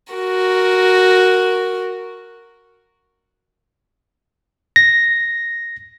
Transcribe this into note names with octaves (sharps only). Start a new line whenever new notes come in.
F#4 A#4
A#6